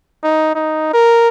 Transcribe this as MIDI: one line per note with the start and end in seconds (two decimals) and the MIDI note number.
0.24 0.52 63
0.55 0.93 63
0.93 1.29 70